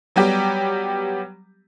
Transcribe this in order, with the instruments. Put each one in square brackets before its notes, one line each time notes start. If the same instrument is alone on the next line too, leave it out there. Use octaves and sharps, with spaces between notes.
[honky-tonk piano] F#3 G3 B3 G4